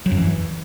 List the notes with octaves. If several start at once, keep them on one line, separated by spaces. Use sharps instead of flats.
F#3
F#2
E3